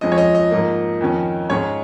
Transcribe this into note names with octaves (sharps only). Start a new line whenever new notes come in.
F2 F3 G#3 C#4 D#5
C#5
D#5
D#5
G#2 F3 A#3
F2 D#3 C#4
G#2 G#3 C#4 C#5